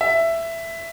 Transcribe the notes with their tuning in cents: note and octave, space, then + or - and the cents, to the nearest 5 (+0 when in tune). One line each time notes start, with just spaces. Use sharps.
E5 +10